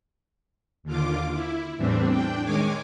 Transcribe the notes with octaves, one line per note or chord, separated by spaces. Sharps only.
D#2 D3 F4 D6
E4
E2 A2 E3 G3 C4 D4
D4 G5
D#3 G#3 C#5 G#5 D6